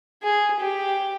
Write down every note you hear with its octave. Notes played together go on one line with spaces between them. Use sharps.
G#4
G4